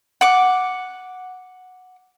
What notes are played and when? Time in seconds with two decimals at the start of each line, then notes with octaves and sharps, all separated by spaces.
0.21 F#5 D6